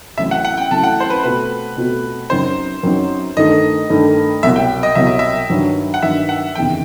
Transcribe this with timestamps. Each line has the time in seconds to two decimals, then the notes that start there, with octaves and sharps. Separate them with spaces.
0.17 A1 A2 F#3 C4 E5
0.31 F#5
0.45 F#5
0.58 G5
0.70 A1 A2 F#3 C4 A5
0.83 F#5
1.00 C5
1.10 B4
1.23 B2 A3 C4 F#4 B4
1.77 B2 A3 C4 F#4
2.30 F#2 F#3 C4 D#4 C5
2.83 F#2 F#3 C4 D#4
3.37 G2 D#3 A3 D#4 D#5
3.89 G2 D#3 A3 D#4
4.43 C2 B2 F#3 E5
4.56 G5
4.83 D#5
4.95 C2 B2 F#3 E5
5.07 D#5
5.19 E5
5.49 G2 D#3 F#3
5.94 F#5
6.02 G2 D#3 F#3 E5
6.29 F#5
6.55 F#1 E2 C3 D#3 G5